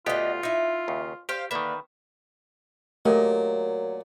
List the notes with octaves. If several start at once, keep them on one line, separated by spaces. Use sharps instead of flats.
D2 D3 B3 F4 G4 D#5
D#4 E4 E5
D#2 C#3
G4 C5 F5
D3 D#3 A#3 B4 E5
A#2 F#3 A3 G4 A#4 D#5